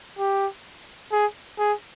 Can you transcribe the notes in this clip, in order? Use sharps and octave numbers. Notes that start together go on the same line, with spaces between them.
G4
G#4
G#4